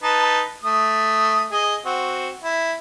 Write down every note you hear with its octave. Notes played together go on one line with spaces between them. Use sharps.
D#4 B4 A5
A3 D#6
G#4 D#5
C4 F#4
E4